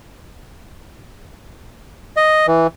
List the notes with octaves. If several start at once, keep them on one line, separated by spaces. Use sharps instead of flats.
D#5
E3